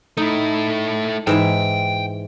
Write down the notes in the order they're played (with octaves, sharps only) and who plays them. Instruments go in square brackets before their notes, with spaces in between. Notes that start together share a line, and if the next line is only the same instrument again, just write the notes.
[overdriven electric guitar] A3 E4 [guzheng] D#4
[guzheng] G#2 E3 E5 [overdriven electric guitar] G5